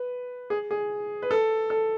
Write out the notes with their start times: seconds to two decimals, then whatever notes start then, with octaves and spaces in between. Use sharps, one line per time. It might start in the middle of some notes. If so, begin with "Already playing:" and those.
Already playing: B4
0.50 G#4
0.71 G#4
1.22 B4
1.31 A4
1.70 A4